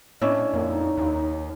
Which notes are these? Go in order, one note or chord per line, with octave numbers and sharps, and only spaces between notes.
A2 C#4 D4 E4 C#5 D#5
F2 A#3
D#4
D#2